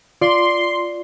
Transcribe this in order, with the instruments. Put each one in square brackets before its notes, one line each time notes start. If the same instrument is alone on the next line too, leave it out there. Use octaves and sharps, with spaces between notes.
[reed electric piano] F4 [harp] D5 [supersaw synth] C6